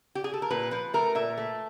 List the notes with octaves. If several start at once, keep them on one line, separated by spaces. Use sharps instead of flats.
G4
G#4
A4
A#4
A#2 B4
F3 B4
A3 A#4
A#2 E5
A3